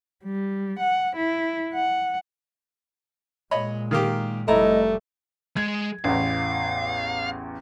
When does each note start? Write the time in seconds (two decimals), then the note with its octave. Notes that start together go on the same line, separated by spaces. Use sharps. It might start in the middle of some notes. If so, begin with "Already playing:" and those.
0.24 G3
0.80 F#5
1.16 E4
1.74 F#5
3.51 A#2 G#3 C#5 D#5 B5
3.91 D#3 A#3 G4
4.48 F1 G3 A3 E4 D#5 A#5
5.57 G#3 G#6
6.04 A1 E2 F5